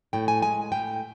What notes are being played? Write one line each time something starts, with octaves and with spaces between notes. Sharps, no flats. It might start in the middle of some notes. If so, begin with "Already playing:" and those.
A2 G5
G#5
G#3 G#5
A2 G5